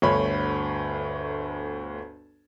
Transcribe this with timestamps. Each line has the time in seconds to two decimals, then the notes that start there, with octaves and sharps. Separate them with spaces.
0.02 G1 D2 C#5 B5